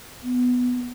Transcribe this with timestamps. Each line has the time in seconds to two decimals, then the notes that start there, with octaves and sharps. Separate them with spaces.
0.23 B3